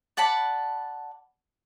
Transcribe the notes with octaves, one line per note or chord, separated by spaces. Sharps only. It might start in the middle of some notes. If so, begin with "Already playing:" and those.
D5 F#5 A5 B5